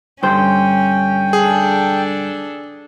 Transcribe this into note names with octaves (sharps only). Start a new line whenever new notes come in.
G2 D3 C#4 C5 G5
D4 G#4 A4